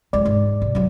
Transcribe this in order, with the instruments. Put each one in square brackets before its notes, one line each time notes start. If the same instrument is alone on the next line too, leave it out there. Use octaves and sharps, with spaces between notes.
[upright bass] F2 G#3 [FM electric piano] D5
[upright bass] G#2
C3
G#1 F#3